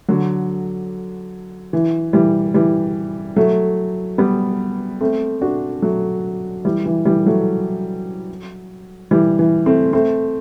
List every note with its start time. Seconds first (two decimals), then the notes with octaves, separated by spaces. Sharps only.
0.09 D3 F#3
1.73 E3
2.13 E3 G3
2.54 E3 G3
3.36 F#3 A3
4.18 G3 B3
5.01 A3 C4
5.42 D4 F#4
5.82 F#3 A3
6.65 E3 G3
6.86 E3
7.05 E3 G3
7.26 F#3 A3
9.11 E3 G3
9.39 E3
9.66 A3 C4
9.93 A3 C4